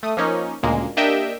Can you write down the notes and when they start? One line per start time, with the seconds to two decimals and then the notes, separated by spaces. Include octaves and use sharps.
0.03 A3 D#6
0.17 F3 A#3 C#4 D#4
0.63 D2 A#2 C#3 G#3 A#3
0.97 A#3 D4 G4 D#5 E5 G5